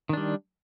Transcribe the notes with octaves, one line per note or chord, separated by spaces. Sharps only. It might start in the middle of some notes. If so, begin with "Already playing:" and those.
D#3 G3 D4